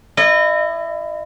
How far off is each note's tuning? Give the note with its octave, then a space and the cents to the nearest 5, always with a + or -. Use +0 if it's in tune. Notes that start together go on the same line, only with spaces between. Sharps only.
E4 +20 D#5 -30